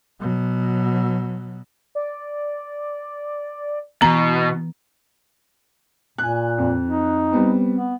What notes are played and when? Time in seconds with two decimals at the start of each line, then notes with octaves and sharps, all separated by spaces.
0.20 B2 F#3
1.95 D5
4.02 B2 E3 B3 A#5
6.18 A#2 G#5 F#6
6.58 F2
6.85 D#4
7.32 G3 B3 C4
7.76 B3